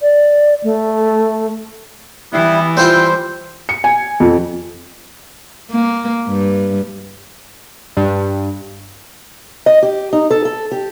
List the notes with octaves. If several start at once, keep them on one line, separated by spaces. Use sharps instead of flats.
D5
A3
E3 G3 B3 E4
G3 C4 E4 F4 C5 G5
C#7
G#5
F2
A#3
G2
G2
D#5
G4
D#4
A4
A4
G4